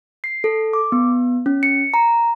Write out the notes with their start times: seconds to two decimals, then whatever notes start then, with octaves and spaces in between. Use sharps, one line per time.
0.24 C7
0.44 A4
0.73 D6
0.92 B3
1.46 C#4
1.63 C#7
1.94 A#5